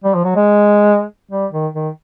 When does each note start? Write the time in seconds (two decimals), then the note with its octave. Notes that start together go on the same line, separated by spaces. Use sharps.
0.04 G3
0.15 F3
0.25 F#3
0.36 G#3
1.31 G3
1.53 D#3
1.74 D#3